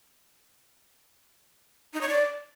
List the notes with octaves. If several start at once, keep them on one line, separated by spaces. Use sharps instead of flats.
D#4
C#5
D5